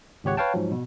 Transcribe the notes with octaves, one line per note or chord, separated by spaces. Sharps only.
G#1 C#2 G4 C#5 F#5
B4 C#5 F5 G5 A5
G#2 F3 F#3
B2